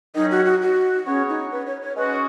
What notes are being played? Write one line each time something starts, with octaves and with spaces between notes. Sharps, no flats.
D#3 F#3 C#4 D#4 G#4
F#4
F#4
F#4
B3 C#4 G#4 C#5
D#4
B4
C#5
C#5
G#3 C#4 F#4 B4 D#5